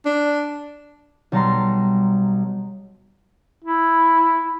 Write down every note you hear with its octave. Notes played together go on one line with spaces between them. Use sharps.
D4
B1 G3 A5 A#5 C6
E4